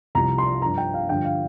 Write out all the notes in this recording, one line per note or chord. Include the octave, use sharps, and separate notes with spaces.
C2 C3 F3 A#5
C6
G2 F3 A#5
G5
F5
G2 D3 F3 G5
F5